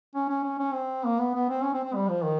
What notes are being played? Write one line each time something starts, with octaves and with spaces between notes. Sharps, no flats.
C#4
C#4
C#4
C#4
C4
A#3
B3
B3
C4
C#4
C4
C4
G3
F3
D#3